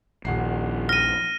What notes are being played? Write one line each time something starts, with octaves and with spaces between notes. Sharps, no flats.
D#1 A#1 D#2 F#5 C7
F6 A#6 D#7